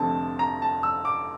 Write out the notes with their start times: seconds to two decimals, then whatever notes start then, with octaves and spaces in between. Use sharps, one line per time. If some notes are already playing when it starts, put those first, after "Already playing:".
Already playing: F1 F2 D3 A3 C4 A5
0.39 A#5
0.62 A5
0.83 E6
1.05 D6